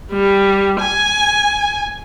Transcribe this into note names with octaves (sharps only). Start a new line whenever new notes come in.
G3
G#5